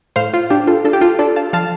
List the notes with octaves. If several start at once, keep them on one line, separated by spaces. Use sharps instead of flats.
A2 C5 F5
F4
D4 G4
F4 A4
D4 F4 A4
G4
F4 A4
D4 A4 D5
F5 A5
F3 F5 A5